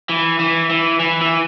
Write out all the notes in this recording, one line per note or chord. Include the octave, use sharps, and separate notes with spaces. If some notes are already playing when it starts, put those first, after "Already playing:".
E3
E3
E3
E3
E3